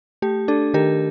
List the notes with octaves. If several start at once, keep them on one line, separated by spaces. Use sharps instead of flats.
A3 G4
D4 A4
D#3 G4 A#4